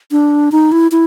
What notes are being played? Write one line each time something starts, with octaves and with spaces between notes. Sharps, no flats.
D4
D#4
E4
E4